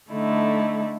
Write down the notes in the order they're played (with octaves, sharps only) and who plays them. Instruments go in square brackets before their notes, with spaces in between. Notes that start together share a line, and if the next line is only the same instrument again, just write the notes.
[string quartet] D3 A3 D#4 E4